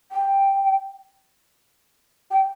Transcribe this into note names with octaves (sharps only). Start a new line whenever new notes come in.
G5
G5